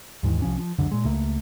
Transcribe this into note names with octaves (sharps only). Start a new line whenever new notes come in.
D#2 G#2 D#3 E3
C2 F3 C#4
F3
F1 C#2 F#2 D3
A#2 G#3
C#2 A3 A#3